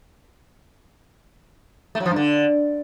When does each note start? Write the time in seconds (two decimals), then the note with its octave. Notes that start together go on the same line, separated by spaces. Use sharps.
1.95 A3
2.00 F#3
2.06 F3
2.11 G2
2.16 D3